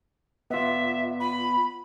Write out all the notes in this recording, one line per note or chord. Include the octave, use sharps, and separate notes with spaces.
B3 F4 E5
B5